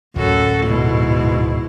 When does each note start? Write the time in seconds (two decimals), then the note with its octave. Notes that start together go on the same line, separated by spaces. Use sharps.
0.16 D1 F#2 F#4 A4
0.66 G#2 B2 E4